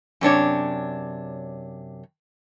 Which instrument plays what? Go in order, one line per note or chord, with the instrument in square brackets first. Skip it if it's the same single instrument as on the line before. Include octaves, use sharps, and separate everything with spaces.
[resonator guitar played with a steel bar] F#2 C3 D4 C#5